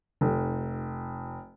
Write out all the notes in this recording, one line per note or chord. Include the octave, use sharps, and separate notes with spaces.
F1